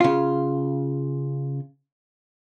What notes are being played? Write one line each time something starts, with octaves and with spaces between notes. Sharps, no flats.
C#3 F4